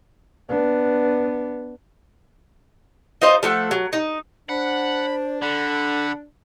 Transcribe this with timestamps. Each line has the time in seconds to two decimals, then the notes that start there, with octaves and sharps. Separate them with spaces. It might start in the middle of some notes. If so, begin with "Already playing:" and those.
0.49 B3 D4
3.22 D#4 F4 C5 D#5
3.43 F3 A3 A4 F#5
3.71 F#3
3.93 D#4
4.49 D4 C5 F#5 B5
5.42 D3 A4 F#5 B5